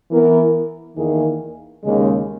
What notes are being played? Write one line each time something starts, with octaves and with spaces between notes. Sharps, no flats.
E3 B3 E4 A#4
E2 D#3 A#3 E4 G#4
D#2 C#3 G#3